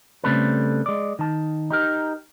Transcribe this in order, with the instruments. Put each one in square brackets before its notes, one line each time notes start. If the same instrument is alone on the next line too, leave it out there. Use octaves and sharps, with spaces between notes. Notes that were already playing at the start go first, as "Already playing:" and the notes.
[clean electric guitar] C#3 G3 A3 C4 A4 B4
G#3 D5
D#3 A5
D#4 G4 A#4